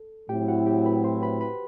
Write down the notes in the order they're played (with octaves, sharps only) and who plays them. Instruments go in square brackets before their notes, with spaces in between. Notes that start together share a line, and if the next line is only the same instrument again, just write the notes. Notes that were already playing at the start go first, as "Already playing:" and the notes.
Already playing: [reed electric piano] A4
[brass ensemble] A2 F#3 C4 E4 [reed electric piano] G4 G5
[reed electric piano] F#4 F#5
G4 G5
B4 B5
C5 C6
B4 B5
B4 B5